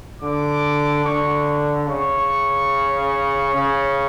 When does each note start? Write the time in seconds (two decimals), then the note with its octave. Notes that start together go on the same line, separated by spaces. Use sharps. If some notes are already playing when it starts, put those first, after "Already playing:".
0.22 D3 D6
1.05 D3 C#6
1.88 C#3 C#6
3.55 C#3